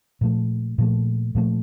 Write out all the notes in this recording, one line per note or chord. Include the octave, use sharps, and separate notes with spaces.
A#2 F3 A3
A#2 F3 A3
A#2 F3 A3